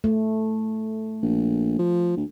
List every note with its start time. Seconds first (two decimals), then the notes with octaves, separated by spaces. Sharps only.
0.04 A3
1.22 A#1
1.79 F3
2.17 D2